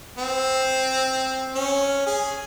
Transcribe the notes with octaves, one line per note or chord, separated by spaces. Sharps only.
C4
C#4
G#4